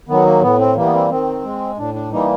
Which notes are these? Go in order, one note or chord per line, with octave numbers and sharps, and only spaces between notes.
D#3 F#3 B3
A#3
A2 B3
C4
E3 G3 A#3
B3
C4
D#3 C4
G#3
A2 D4
D4
E3 G3 A#3 D#4